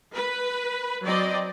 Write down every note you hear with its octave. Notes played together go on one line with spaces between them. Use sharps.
B4
F#3 C4 D5 D#5